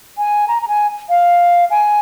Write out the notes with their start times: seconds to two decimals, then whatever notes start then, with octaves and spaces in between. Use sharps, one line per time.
0.18 G#5
0.48 A#5
0.62 A#5
0.68 G#5
1.09 F5
1.71 G#5